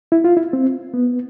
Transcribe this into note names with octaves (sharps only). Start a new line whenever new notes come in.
E4
F4
E4
C4
B3